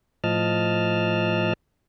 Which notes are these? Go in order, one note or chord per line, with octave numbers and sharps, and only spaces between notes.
A2 F3 D#5 A5 F6